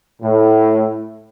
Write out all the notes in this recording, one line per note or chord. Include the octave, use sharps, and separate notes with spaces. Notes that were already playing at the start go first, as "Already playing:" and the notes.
A2